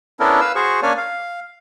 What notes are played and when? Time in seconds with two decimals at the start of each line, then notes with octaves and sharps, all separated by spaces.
0.20 B3 C#4 D4 E4 A4 A#4
0.41 B4 F5 E6
0.55 F#4 G#4 C5 C#6
0.82 A#3 C#4 D4 C#5 D5 G#5
0.98 F5